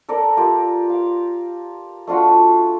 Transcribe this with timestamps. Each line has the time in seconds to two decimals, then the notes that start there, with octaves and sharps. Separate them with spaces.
0.09 A4 A#4 D5
0.37 F4 G4 A#4
0.90 F5
2.07 A3 D4 F4 F#4